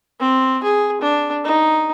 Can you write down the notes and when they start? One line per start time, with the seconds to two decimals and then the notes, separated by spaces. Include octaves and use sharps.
0.20 C4
0.63 G#4
1.01 D4
1.44 D#4